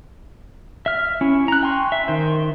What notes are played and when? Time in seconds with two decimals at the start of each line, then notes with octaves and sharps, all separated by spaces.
0.86 E5 F6
1.21 C#4 E4
1.48 A#5 F#6
1.63 G5 G#5 C6 C#6
1.92 E5
2.08 D#3 C5